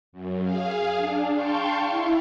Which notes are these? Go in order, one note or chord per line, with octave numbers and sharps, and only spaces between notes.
F#2
G#4 F5
D4
F5 G5 A5 C6 C#6 G6
E4